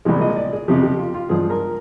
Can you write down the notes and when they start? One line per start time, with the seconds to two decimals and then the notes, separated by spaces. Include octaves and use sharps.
0.05 C2 A#2 F3 G#3 G4
0.21 D#5
0.36 D5
0.53 G#4
0.68 F2 C3 F3 G4
0.83 G4
0.99 F4
1.15 F4
1.29 G2 F3 G#3 G#4
1.50 A#4